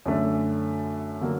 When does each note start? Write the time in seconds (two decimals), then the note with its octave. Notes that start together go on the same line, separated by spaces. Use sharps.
0.06 F#2 D3 A3 D4
1.21 D3 F#3 A#3